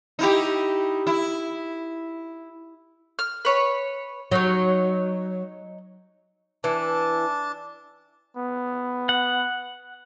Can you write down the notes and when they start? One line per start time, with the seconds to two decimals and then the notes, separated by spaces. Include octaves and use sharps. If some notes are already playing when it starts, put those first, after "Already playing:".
0.19 D#4 E4 G4
1.07 E4
3.19 F6
3.45 B4 C#5 B5
4.31 F#3 D#4 C#5
6.64 E3 D4 A5
8.37 B3
9.09 F#5